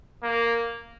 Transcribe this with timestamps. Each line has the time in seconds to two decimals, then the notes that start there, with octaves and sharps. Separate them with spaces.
0.23 A#3